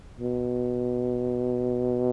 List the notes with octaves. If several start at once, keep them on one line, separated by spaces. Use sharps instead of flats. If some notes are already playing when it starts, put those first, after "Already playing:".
B2